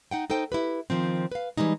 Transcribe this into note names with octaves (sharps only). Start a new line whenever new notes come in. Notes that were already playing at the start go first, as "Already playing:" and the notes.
D#4 F#5 G5
D#4 A4 C5 G5
E4 G4 B4
D#3 F3 C4
B4 F5
E3 F3 G3 G#3 D#4